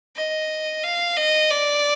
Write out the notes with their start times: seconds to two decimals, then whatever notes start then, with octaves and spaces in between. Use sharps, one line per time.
0.16 D#5
0.83 F5
1.17 D#5
1.50 D5